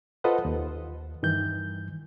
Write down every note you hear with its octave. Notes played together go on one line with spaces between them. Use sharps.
F4 A4 B4 C5 D#5 F#5
D#2
G2 D#3 E3 G6